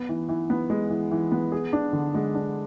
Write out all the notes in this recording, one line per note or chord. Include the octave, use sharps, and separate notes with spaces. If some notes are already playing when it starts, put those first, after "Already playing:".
Already playing: B3
E3
E3
B3
G#3
E3
E3
B3
G#4
D4
D3
G#3
D4